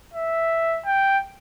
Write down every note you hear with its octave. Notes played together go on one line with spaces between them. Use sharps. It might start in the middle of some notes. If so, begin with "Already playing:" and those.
E5
G5